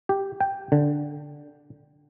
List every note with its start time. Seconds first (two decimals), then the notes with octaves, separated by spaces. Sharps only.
0.09 G4
0.40 G5
0.72 D3